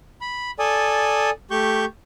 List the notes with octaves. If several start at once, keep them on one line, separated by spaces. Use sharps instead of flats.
B5
A4 D5 G#5 D#6
A3 G4 C#6 G6